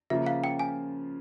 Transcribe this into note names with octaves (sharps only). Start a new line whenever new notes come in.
C#3 F3 A#3 F4 E5
F5
G5
G#5